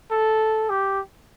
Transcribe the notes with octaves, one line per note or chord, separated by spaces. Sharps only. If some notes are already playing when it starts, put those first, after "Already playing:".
A4
G4